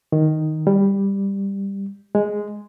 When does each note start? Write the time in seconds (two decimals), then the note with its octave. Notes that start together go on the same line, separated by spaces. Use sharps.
0.12 D#3
0.67 G3
2.15 G#3